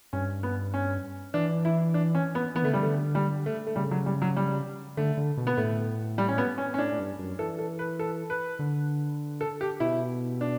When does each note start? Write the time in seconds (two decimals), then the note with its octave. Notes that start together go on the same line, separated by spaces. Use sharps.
0.13 G2 C#4
0.43 B3
0.74 C#4
1.34 E3 D4
1.65 E4
1.94 D4
2.15 C#4
2.35 B3
2.55 E3 B3
2.63 D3 A3
2.70 C#3
2.73 G3
2.79 D3 A3
3.15 G3
3.46 A3
3.67 A3
3.76 C#3 G3
3.91 F#3
4.06 G3
4.22 F#3
4.36 G3
4.97 D3 A3
5.17 D3
5.37 B2
5.47 B3
5.57 A2 A3
6.18 G3
6.28 C#4
6.38 B3
6.58 C#4
6.74 C#4
6.78 A2 D4
6.92 A2
6.98 G2
7.18 F#2
7.39 E3 A4
7.59 A4
7.79 B4
7.99 A4
8.30 B4
8.59 D3
9.41 A4
9.61 G4
9.80 B2 E4
10.41 D4